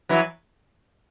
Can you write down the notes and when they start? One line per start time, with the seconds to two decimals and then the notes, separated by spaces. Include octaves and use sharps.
0.09 E3 F#3